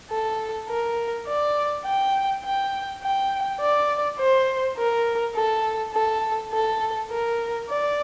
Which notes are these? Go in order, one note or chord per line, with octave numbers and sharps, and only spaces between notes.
A4
A#4
D5
G5
G5
G5
D5
C5
A#4
A4
A4
A4
A#4
D5